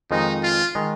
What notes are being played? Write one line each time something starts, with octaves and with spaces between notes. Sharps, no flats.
F2 D#3 G#3 D#4
F4
D#3 G#3